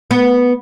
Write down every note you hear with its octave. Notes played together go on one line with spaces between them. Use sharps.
B3